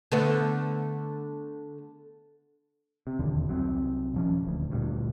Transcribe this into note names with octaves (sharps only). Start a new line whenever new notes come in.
D3 A3 B3
C3
E1 D#2 D3
C2 F#3 C4
D#1 F3 C#4
D#1 D2
D2 G2 A#2